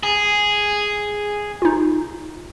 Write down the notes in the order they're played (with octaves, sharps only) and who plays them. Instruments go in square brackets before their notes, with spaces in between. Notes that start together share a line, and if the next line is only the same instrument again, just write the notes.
[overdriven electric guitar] G#4
[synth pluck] D#4 F4